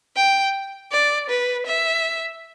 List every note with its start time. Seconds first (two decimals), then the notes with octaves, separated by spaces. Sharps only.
0.16 G5
0.92 D5
1.30 B4
1.66 E5